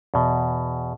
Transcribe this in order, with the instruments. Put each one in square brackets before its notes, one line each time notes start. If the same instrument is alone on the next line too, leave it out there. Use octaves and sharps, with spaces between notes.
[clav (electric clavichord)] E2 B2